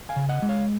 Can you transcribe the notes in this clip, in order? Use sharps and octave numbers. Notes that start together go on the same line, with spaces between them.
F5 G#5
C#3
D#5 F#5
G#3
C#5 F5